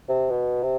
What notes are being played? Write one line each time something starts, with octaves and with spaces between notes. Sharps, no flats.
C3
B2
C3